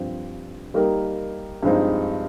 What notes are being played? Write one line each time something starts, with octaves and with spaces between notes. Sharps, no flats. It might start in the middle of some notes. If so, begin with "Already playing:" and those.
Already playing: G2 F3 C4
G3 A#3 D#4 G4 A#4
G2 F3 G#3 C4 D#4